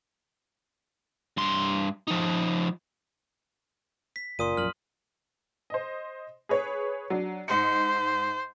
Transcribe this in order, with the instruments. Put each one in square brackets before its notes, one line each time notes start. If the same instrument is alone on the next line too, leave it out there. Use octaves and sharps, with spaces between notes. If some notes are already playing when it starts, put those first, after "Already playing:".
[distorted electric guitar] G2 C6
F3 D#4
[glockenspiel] B6
[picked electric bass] F#1 [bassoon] A#2 [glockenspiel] C6 D#6 D#7
[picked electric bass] A#1 F#2 [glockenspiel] F6 F#7
[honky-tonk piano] C5 D#5
G#4 B4 C#5
F#3 D4
[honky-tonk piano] G#2 D#4 C#7 [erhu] C5